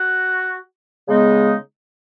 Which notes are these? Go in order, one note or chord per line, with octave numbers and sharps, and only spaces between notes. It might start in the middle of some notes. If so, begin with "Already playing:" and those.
Already playing: F#4
C#3 G#3 B3 D#4